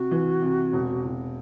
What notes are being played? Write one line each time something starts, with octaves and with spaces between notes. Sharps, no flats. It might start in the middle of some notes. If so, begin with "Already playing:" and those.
Already playing: C3 F#4
E3
C3
E1
E1